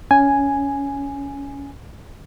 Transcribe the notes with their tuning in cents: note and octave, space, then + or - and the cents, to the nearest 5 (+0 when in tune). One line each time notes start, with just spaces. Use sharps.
C#4 +15 G#5 +0